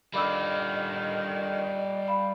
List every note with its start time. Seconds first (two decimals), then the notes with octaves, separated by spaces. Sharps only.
0.14 D3 D#3 G3 F4 D#5 B5 D6 E6
2.08 F5 B5